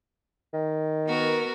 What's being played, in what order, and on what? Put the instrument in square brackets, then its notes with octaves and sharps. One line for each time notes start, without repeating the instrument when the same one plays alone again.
[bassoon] D#3
[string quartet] B3 F#4 A#4